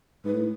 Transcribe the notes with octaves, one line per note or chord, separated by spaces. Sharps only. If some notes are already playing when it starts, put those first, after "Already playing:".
G#2 B4
A2